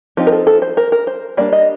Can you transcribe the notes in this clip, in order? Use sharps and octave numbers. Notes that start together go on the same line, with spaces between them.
F3 C4 D#4 G4
A#4
A4
A4
C5
A#4
A#4
C5
G3 A#3 D4 D5
D#5